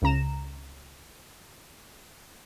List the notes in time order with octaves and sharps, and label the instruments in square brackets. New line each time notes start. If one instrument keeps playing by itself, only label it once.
[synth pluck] C#2 C#3 A#5 E7